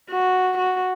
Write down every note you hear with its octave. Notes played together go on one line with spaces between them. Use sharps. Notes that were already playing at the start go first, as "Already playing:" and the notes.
F#4
F#4